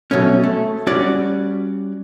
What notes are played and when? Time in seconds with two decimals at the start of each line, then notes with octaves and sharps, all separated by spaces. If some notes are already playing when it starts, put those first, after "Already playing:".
0.11 B2 F#3 A3 C#4
0.43 A3
0.87 G3 C#4 F#4 C#5 D5